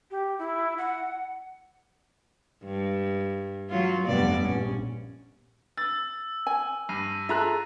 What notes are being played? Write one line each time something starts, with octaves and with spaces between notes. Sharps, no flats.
G4
E4
F#5
G2
F#3 F4
F1 G2 B3 D5
A#1 C#4
E6 A6
G#5
G2 A#6 C7 D#7
F4 G#4 A4 E5 A#5 F#6